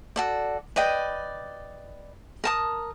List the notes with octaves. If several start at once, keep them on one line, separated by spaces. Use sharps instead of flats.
F#4 A4 D5
B4 D5 D#5 G5
A#4 A5 D#6